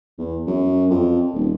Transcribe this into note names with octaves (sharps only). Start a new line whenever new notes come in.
E2
F#2
F2
D#1